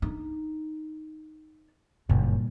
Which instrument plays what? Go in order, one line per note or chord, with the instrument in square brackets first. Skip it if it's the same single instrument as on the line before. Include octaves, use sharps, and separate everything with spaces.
[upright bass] D4 D#4
[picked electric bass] F#1 [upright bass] G2 A#2